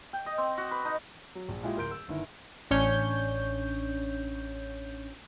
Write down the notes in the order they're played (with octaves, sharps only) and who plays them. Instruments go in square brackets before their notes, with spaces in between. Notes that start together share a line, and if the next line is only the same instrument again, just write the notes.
[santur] G5
D#5
C4
F#4
B4
D#4
[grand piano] F#3
A#1
A#2 G#3 E4 F4 G4 G#5
D1 A#4 C6 G6 D7
E6
G1 D#3 E4
[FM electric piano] A1 C#4 D4 C#5 G6